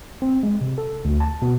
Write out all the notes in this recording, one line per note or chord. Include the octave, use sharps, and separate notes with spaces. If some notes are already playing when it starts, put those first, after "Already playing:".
C4
G#3
C3
A4
D2
A5
B2